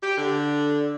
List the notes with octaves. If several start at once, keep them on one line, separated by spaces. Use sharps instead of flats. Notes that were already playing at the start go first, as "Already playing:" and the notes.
G4
D3